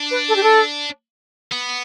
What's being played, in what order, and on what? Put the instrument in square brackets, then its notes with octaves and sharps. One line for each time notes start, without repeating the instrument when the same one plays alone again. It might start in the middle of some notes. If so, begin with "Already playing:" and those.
Already playing: [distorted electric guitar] D4
[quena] B4
A4
G4
A4
[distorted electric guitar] B3